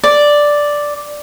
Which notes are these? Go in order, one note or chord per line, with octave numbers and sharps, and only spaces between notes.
D5